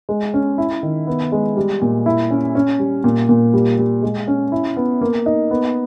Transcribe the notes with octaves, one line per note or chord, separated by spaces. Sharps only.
G#3
C#4
E4
D#3
B3
G#3
G3
A#2
E4
C#4
C#4
G3
A#2
A#2
G3
G3
G#3
C#4
E4
B3
A#3
D#4
B3